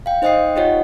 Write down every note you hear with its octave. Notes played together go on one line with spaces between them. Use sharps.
F5 G5
D#4 C5 D#5 G5 D#6 C7
D#4 F4 G4 C#5 D#5 F#5